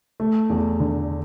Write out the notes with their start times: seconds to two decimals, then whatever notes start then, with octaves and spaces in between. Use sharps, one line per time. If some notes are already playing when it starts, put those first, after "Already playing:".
0.20 A3
0.50 E2
0.80 D3